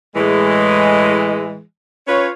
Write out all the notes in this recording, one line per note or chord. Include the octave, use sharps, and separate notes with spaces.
A2 E3 G#3
C#4 F4 B4 C#5